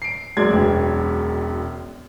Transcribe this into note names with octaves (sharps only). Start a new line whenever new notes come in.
C7 D7
F#2 G#3 D5 G#6
E1 G4